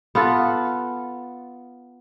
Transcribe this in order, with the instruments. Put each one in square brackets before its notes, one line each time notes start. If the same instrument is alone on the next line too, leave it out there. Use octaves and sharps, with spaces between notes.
[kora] B3 F4 A4